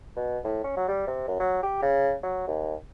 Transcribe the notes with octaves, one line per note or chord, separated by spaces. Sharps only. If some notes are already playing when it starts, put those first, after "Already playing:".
B2
A2
C#4
F#3
G3
C3
F#2
F#3
G4
C#3
F#3
D#2